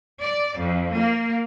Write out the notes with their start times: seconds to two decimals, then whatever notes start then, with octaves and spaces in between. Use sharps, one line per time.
0.22 D5
0.59 F2
0.95 A#3